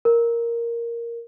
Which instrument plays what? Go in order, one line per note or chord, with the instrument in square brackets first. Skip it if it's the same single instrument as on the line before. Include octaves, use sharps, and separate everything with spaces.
[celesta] A#4